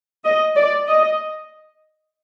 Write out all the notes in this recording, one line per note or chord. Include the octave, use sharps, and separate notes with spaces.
D#5
D5
D#5